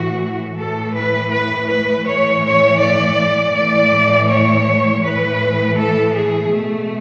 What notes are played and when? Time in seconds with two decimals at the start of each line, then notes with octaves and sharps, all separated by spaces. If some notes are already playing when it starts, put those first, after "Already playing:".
Already playing: A2 E3 F#4
0.57 A2 E3 A4
0.95 B4
1.32 B4
1.69 B4
2.06 A2 E3 C#5
2.44 C#5
2.80 D5
3.54 A2 E3 D5
4.28 C#5
5.03 A2 E3 B4
5.77 A4
6.14 G#4
6.51 B2 A3